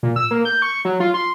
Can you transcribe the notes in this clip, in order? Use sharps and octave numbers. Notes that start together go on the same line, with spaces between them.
A#2
E6
A#3
G6
C#6
F#3
F4
C6